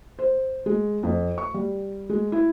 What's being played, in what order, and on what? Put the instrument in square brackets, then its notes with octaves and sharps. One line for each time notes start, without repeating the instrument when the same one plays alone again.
[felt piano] C5
G#3
F2
C#6
G3
G#3
E4